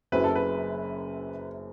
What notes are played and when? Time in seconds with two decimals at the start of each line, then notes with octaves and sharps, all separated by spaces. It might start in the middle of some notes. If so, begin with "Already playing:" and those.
0.12 F#1 F#2 F#3 C4 E4 B4
0.24 A4
0.35 B4